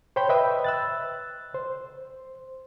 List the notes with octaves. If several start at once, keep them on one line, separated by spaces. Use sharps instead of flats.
C5 C#5 G5 B5 G6
B4 D#5 E5 G5 B5
E6 F#6 A6
C5